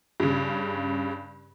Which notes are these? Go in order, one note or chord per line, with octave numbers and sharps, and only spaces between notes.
G2 C#3